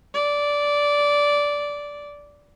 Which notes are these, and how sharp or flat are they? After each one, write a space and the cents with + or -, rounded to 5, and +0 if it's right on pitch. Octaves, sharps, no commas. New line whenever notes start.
D5 -15